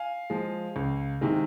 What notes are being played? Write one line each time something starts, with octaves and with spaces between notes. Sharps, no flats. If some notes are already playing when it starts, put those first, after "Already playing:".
Already playing: F5 G#5
F3 G#3
C#2
C3 D#3 G#3